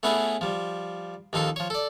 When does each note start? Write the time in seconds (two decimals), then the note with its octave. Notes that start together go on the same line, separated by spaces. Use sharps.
0.03 A3 B3 C#4 E4 G#4 B4
0.41 F3 G3
1.33 D#2 F3 D#4 A4 C6
1.56 F3 C#5
1.70 A4 D5